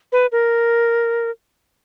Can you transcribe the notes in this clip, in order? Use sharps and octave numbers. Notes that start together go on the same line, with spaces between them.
B4
A#4